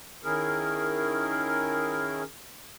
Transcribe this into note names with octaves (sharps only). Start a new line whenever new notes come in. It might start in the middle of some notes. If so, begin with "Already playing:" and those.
D#3 C#4 E4 G#4 A#4